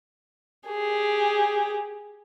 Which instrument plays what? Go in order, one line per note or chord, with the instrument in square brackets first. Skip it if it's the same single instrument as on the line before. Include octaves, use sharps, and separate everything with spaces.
[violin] G4 G#4